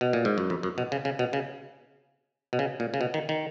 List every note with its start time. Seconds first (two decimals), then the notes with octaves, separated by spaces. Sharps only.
0.01 B2
0.13 A#2
0.25 G#2
0.38 F#2
0.50 F2
0.63 F#2
0.78 B2
0.92 C#3
1.05 C#3
1.19 B2
1.33 C#3
2.53 B2
2.59 C#3
2.80 A#2
2.94 C#3
3.01 B2
3.14 D#3
3.29 D#3